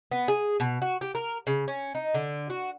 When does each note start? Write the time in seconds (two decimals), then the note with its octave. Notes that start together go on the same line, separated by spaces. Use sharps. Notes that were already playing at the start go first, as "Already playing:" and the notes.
0.12 B3
0.28 G#4
0.60 B2
0.82 F#4
1.01 G4
1.15 A#4
1.47 C#3
1.68 C#4
1.95 D#4
2.14 D3
2.50 F#4